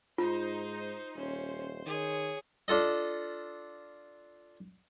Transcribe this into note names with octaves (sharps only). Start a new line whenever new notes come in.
G#2 D#4 F4 C5
D#1 C#4 C5
D#3 G#4 C#5
D4 F4 A4 D#5